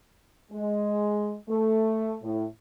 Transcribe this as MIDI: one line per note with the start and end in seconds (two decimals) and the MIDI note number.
0.51 1.35 56
1.49 2.17 57
2.23 2.44 45